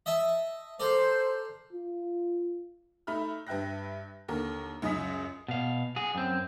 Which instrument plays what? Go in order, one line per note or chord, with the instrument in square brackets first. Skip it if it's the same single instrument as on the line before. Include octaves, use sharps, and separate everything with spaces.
[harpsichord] D#5 E5 A5
[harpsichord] A4 A#4 D5 [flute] C5
[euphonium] F4
[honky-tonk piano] A3 D#4 E5 B5 F6
G2 B4 E5 G5 F#6 A#6
D#2 D3 A#4
C#2 F#2 D#5 G#5 D#6 B6
[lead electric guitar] B2 F5
F#4 G#4
F#2 C4